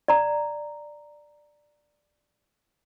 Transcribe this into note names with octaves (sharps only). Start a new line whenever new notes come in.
D5 A#5